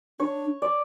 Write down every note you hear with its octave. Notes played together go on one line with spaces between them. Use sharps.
D4 C#5
D5